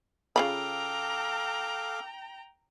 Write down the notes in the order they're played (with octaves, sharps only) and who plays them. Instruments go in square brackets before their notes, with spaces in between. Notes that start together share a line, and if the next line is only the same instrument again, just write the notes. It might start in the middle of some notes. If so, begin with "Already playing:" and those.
[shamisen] C#3 F4 B5 [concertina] A4 F5 D6 [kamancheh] G5 A#5